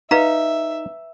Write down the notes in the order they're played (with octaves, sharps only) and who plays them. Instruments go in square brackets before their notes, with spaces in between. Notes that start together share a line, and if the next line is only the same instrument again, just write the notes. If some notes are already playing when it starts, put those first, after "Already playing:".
[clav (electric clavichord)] D#4 [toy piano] B4 F5 A#5 [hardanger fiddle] E5